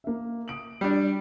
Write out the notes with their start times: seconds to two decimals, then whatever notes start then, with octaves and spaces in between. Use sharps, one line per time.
0.04 A#3 E5
0.48 D#6 D7 F#7
0.81 G3 D4